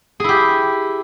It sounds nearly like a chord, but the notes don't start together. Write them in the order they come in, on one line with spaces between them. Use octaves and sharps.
G#4 E4 G4